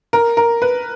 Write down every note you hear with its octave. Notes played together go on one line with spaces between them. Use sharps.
A#4
A#4
B4